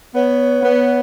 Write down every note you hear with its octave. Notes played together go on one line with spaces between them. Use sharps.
B3 C#5
B3